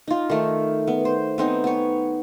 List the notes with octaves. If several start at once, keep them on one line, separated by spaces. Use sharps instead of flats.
D#4 F4
D#3 A3
B3
C5
B3 C4 D#4
B3 C#5